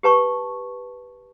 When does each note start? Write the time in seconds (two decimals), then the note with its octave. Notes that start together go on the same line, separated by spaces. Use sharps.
0.03 G4 B4 A5 C#6